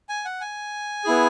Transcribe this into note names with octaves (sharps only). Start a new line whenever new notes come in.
G#5
F#5
G#5
B3 E4 G#4